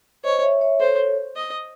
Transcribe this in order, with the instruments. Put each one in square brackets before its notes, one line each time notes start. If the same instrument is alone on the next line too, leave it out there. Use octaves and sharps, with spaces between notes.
[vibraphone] C5 D#5 [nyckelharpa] C#5
[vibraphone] C#5 E5
C#5 E5
[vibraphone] A4 C#5 [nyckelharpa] C5
[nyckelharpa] D#5